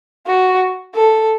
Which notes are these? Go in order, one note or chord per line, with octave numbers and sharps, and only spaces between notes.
F#4
A4